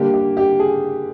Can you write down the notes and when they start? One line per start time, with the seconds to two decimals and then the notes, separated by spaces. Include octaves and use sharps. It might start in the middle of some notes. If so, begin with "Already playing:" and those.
Already playing: D3 G3 A#3 G4
0.14 G4
0.37 G4
0.59 G#4